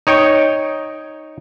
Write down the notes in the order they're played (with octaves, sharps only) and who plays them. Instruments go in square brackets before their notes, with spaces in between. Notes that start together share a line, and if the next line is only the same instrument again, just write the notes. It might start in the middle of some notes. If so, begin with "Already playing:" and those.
[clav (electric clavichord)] D#4 C#5 G5